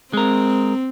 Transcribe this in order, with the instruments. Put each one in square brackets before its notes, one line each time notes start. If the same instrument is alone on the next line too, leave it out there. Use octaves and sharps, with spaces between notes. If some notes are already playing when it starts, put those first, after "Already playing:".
[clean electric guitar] G#3 A#4 [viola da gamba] C4